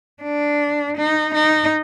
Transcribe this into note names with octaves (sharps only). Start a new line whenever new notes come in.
D4
D#4
D#4